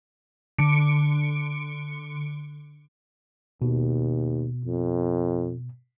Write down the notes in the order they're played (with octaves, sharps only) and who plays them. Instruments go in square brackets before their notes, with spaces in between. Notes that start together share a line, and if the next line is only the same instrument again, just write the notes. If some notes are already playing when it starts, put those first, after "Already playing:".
[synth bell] D3 C#7 D7
[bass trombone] D#2 [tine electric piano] B2
[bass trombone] F2